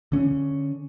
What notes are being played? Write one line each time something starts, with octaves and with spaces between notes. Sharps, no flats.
D3 C#4